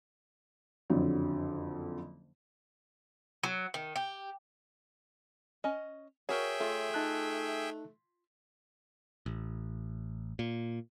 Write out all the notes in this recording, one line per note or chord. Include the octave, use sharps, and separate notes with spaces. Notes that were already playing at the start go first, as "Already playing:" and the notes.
F#1 F2 D3 F#3
F#3
D#3
G4
C#4 D#5
F#4 G#4 A#4 C#5 E5 G5
A3 F4
D#4 A5 F#6
A1
A#2